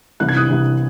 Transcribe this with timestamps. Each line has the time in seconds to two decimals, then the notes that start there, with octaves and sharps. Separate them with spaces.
0.20 C2 C3 E3 F#6
0.29 G#6
0.37 D#6 F#6
0.49 C2 C3 E3